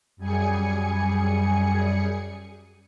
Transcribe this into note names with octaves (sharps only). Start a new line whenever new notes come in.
F#2 G3 G#4 G#5 C#7